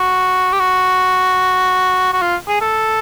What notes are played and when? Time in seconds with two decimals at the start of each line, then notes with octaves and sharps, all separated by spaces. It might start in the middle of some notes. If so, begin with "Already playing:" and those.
Already playing: F#4
0.52 G4
0.60 F#4
2.13 F#4
2.21 F4
2.48 G#4
2.61 A4